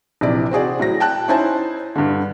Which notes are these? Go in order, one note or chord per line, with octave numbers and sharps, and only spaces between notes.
A#1 C3 E3 D5
C4 F#4 G#4 D5
A2 F#3 A#6
G5 A5 F#6
C#4 D#4 E4 C5 G#5 A5
G2 D3